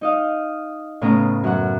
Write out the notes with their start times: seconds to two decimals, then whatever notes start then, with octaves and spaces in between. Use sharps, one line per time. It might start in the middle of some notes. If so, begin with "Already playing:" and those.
0.01 D#4 D#5 F5
1.01 A2 C#3 B3 C#4 A#5
1.44 F#2 F#5